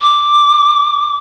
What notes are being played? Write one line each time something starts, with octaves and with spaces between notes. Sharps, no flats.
D6